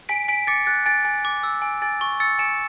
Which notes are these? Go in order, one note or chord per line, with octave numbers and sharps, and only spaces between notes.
G#5 B6 D7
G#5 B6 D7
D6 A6 C#7
F#6 A6
G#5 A6
G#5
D6
E6
G#5
G#5 A6
C#6
E6 A6 C#7
G#5 C#7 E7